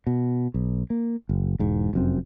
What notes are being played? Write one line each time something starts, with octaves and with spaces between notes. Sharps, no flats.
B2
B1
A#3
F#1
E1 G#2
F1 F#2 C4